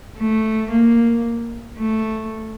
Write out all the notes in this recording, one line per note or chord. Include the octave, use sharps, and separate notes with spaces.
A3
A#3
A3